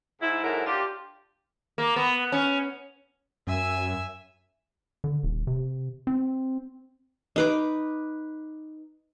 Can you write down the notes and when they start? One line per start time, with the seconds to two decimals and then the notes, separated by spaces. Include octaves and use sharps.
0.22 G#2 E4
0.44 G#2 F#3 E4 A4 A#4
0.67 D4 F4 G4
1.78 A#3
1.96 B3
2.32 C#4
3.47 F#2 E5 G#5 E6
5.04 D3
5.23 D#1
5.47 C3
6.07 C4
7.36 D#4 B4 D6